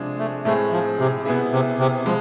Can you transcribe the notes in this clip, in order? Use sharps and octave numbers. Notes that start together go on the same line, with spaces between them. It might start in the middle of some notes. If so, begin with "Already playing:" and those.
Already playing: C3 F3 G#3 D4 G#4
A3
A2 G#3 A3 C4 G#4
F3
C3
B2 B3 E4 G#4
C3
C3
F3 G#3